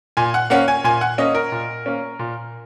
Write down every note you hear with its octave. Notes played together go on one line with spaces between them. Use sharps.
A#2 G#5
F#5
A#3 C#4 F#5
G#5
A#2 G#5
F#5
A#3 C#4 D#5
A#4
A#2
A#3 C#4
A#2